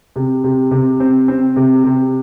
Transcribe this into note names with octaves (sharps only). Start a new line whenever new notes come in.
C3
C3
C3
C4
C4
C3
C3